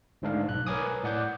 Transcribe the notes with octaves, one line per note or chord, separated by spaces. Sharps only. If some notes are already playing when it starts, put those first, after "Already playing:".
G1 G#2 A3 D4 F5
B1 F#6
A#4 B4 C#5 G#5 D6 D#6
A2 D5 F#5 D6 G6